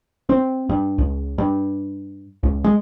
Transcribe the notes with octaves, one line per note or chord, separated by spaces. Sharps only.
C4
G2
C#2
G2
C#2
G#3